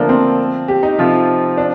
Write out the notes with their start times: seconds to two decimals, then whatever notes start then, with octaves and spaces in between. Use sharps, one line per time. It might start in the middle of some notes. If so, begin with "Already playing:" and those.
Already playing: D3 F3 A3 A#3 D4
0.09 C4
0.68 G4
0.83 D#4
0.98 C3 F3 C4 F4 A4
1.57 D4